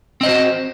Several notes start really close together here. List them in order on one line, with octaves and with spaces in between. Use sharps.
C4 D#5 C5 F#4